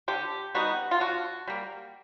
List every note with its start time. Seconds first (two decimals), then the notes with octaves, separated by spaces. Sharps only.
0.08 D3 G4
0.55 G3 B3 D#4 F#4
0.91 F4
1.00 D3 F#4
1.47 G3 A#3